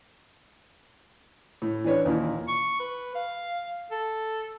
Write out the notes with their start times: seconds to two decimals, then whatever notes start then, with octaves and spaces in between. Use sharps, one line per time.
1.62 A2
1.84 E3 D4 B4 C#5
2.05 D#2 A#2 E3
2.48 C#6
2.80 B4
3.15 F5
3.91 A4